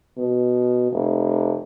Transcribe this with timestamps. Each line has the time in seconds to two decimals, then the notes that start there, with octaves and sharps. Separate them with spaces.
0.17 B2
0.92 F1